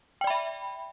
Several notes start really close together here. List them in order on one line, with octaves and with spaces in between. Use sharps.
G5 D5 B5 E5